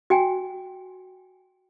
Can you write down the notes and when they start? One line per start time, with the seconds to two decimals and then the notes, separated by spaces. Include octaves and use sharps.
0.10 F#4 G5 G#5